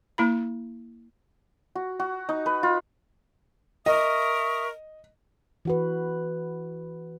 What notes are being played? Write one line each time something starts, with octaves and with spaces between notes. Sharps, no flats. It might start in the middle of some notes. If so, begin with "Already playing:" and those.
A#3 E4 B5
F#4
F#4
D#4
B4
F4
A#4 D#5 E5 C#6 D#6
E3 F#4 B4